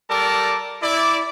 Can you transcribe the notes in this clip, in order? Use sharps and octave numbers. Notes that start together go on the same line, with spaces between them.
G3 A4 A#4 D5 A5
E4 D5